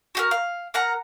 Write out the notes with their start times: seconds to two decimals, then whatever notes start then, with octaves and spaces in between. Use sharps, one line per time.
0.15 F#4 G4 A#4
0.31 F5
0.74 A#4 F#5 A#5